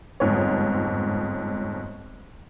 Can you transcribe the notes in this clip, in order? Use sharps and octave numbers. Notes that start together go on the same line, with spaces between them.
G1 F2 G#2 C#5